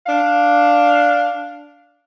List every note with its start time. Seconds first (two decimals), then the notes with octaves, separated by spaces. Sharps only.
0.07 D4 F5